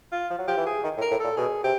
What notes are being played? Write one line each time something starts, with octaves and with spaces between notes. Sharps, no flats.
F4
F3
F#3
F3 G4
E3
G#4
D#3
A2
A#4
A2
A#2 A4
B2 G#4
C3 G4